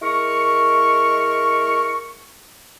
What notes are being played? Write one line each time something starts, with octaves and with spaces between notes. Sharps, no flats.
G#3 E4 A#4 C#6